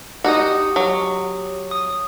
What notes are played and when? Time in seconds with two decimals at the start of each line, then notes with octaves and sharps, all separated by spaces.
0.24 D#4 F#4 G4 D#6
0.76 F#3
1.71 D#6